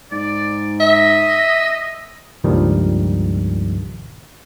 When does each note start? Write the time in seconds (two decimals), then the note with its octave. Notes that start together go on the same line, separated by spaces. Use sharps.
0.12 G#2 D5
0.80 D#5 E5
2.44 C#2 G2 A#2 D#3 F3 G3